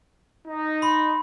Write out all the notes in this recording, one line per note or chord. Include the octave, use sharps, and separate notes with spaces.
D#4
B5 C6